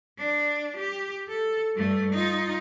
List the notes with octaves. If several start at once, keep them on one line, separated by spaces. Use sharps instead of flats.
D4
G4
A4
G2 A3
D#4 F4